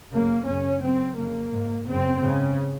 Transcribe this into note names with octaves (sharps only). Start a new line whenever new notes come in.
F#2 C#3 A#3
F#2 C#3 C#4
F#2 C#3 C4
F2 C#3 A#3
G#2
F#2 C#3 C4
G#2 C#3